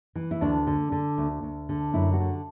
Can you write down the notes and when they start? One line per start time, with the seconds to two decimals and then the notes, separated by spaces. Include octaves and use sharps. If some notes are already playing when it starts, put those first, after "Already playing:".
0.15 E3
0.31 E4
0.41 D2 D4
0.67 D3
0.92 D3
1.18 D2
1.43 D2
1.69 D3
1.94 F#2 E4
2.13 F#4
2.20 D3